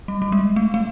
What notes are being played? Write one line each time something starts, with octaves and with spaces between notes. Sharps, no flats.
G3
G3
G#3
A3
A3